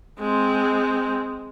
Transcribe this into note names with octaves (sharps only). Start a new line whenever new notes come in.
G#3 C4